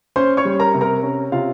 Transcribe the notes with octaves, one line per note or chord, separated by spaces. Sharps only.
C#4 C5 C6
C#5 C#6
G3
A#4 A#5
C3
A#4 A#5
C#4
C3 F4 F5